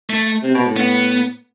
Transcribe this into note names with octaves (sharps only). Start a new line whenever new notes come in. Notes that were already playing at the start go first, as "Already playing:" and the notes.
A3
C3
B2
A2
B3